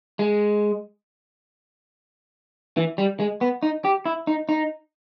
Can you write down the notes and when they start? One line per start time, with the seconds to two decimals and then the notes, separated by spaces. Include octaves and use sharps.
0.19 G#3
2.77 E3
2.98 G3
3.20 G#3
3.41 B3
3.63 D#4
3.85 G4
4.06 E4
4.27 D#4
4.49 D#4